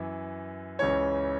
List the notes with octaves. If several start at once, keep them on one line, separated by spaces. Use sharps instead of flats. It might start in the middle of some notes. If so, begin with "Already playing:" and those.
Already playing: F#2 E3
C#2 C#3 E3 C#5